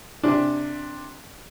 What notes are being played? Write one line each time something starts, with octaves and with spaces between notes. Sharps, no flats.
C3 D4